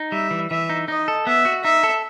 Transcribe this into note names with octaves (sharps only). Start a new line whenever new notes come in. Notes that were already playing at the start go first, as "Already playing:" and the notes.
Already playing: D#4
G3 E5
E3
E3 E5
D#4
D#4 D#5
A4
B3 E5
F#4
D#4 E5
A4